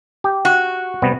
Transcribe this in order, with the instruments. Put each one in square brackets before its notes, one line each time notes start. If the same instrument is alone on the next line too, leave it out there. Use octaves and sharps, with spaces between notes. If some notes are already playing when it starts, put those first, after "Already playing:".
[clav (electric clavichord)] G4
[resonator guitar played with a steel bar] F#4
[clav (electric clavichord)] C3 G3 B3